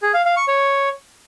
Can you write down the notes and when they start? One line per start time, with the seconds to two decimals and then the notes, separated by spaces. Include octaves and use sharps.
0.02 G#4
0.14 F5
0.25 F5
0.37 C#6
0.48 C#5